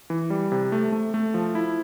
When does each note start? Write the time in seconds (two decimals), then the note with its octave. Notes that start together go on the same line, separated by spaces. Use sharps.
0.10 E3
0.30 G3
0.52 C3
0.72 A3
0.92 A3
1.14 A3
1.34 F3
1.55 E4